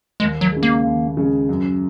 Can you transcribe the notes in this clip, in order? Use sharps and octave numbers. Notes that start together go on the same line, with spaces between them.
D#2 G#3
F#3
C#3 G#3
A#3
D#2
C#3 G#3
F#2